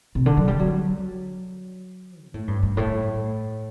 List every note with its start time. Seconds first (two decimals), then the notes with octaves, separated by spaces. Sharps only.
0.15 C3
0.26 D3
0.37 F#3
0.48 G3
0.59 F#3
2.25 A#2
2.34 A2
2.48 G2
2.62 G2
2.77 A2